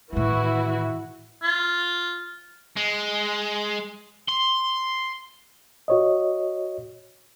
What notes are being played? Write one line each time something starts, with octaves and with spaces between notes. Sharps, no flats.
A2 D#3 E3 E4 F#4
F4
G#3
C6
F#4 C#5 D#5